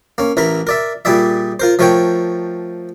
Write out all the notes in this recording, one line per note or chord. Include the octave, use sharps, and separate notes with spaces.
A#3 C#4
A1 E3 A#4 A#5 B5
A#4 D5 E5
A#2 G3 G#4 D5 E5
F4 A#4 C5
F3 A3 A#4 C#5 G5